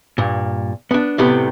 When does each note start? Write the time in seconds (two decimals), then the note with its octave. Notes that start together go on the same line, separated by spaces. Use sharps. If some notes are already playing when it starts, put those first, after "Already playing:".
0.18 G2 A#2
0.91 B3 D4
1.18 C2 A2 C3 A3 B3 G4